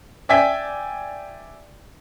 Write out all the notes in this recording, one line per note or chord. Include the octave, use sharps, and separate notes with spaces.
D5 E5 G5 G#5 B6